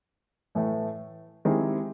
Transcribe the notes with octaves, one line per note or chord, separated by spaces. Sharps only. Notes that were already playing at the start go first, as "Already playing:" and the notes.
A2 E3 A3
D#3 G#3 C4 E4 G4